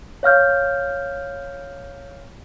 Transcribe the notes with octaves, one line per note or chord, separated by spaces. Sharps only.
C#5 F5 F6 G6